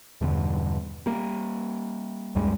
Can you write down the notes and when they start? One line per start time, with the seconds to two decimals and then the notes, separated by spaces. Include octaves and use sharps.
0.21 E2 G2 B2 D3
1.06 G3 A#3
2.35 C#2 F#2 G3 G#3